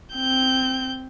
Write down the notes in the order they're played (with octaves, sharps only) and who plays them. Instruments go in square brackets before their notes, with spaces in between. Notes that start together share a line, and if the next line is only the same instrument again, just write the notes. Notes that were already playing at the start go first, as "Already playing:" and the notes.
[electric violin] C4 G6